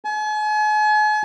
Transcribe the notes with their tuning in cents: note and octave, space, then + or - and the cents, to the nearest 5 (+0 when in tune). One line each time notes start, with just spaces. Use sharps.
G#5 +40